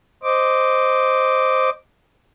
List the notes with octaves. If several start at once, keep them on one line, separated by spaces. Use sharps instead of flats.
C5 D#5 D6